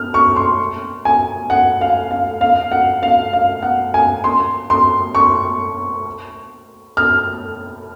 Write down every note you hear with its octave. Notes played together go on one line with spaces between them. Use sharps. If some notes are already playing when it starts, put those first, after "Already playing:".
Already playing: F6
C#6
C6
G#5
F#5
F5
F5
F5
F#5
F5
F5
F#5
G#5
C6
C6
C#6
F6